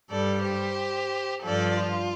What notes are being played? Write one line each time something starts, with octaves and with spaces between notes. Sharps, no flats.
G2 G3 A4 D5
G4 C5
G2 F3 A4 D5
F4